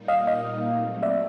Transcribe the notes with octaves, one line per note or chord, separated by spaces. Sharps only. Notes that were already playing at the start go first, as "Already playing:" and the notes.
Already playing: A#2 G3 A#3 D#4
D#5 F5
D#5 F5
F#3 A3 C4
D5 E5